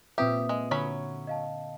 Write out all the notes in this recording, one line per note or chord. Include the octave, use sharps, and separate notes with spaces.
A#2 C4 F4 G4 B4 E5 D#6
G#3
D3 F#3 C#4 B5
D#5 F5 A5